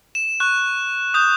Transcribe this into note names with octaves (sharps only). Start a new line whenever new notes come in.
E7
C#6 F#6
D#6 G6